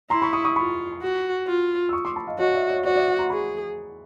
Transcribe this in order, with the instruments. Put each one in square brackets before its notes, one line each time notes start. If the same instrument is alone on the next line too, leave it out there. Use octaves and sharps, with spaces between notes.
[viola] E4 [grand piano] A#5 C6
[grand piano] B5 C#6
C#6 D#6
C#6 D#6
[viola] F4 [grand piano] B5 C#6
[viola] F#4
F4
[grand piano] E6
C#6 D#6
C6 D6
A5 B5
D#5 F5
[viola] F#4 [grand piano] C#5 D#5
[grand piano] D5 E5
C#5 D#5
[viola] F#4 [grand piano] C5 D5
[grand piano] D5 E5
E5 F#5
A#5 C6
[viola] G#4 [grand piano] B5 C#6